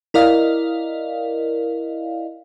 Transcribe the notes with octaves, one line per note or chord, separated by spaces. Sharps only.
E4 A#4 D5 D#5 F5